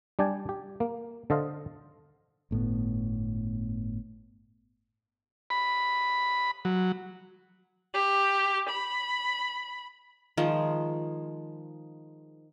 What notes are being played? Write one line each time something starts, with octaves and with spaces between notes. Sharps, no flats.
G3 D4 D5 G5 G#5
G4
A#3
D3 A4 C5 D#5 F5
G1 A2 C#3 B3
B5
F#3
G4
B5
D#3 F3 G#3